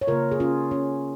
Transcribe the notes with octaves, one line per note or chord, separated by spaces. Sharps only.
C#5
C#3 A#3 F4 A#4
G#4
C#4 F4
C#4